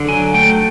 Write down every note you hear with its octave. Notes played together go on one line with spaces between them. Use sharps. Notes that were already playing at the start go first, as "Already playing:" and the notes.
Already playing: D3
F#3 G#5
A3 G5